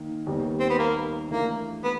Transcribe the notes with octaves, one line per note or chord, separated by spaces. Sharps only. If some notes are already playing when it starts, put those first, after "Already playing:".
Already playing: D#3 A#3
D#2 D#3 G3 B3
C4
B3
A#3
E3 A3 A#3 D4
B3